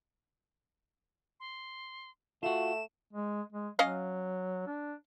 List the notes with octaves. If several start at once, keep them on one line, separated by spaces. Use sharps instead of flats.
C6
A3 F4 F#4 E7
G#3
G#3
F#3 C#4 D#5 F5
D4